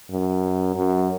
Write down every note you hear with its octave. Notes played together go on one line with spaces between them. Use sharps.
F#2
F#2